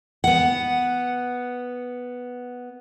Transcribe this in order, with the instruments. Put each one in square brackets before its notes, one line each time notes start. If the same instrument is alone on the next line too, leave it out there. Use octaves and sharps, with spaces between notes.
[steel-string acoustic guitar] B3 F#5